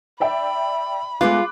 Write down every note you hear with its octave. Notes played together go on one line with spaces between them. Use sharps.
D5 E5 G5 B5
G#3 A3 B3 F4 D6 F#6